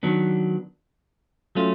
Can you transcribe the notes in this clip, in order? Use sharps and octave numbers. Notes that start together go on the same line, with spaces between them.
D#3 F#3 B3 D4
F#3 A3 C#4 F4